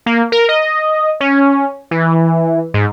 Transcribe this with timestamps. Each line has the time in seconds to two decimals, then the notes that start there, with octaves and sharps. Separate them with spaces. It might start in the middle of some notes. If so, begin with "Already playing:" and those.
0.06 A#3
0.32 A#4
0.49 D#5
1.20 C#4
1.91 E3
2.74 G#2